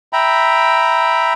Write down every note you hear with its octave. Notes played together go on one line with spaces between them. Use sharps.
E5 G5 A#5 B5